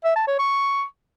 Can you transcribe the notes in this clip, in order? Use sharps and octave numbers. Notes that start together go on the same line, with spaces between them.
E5
A5
C#5
C#6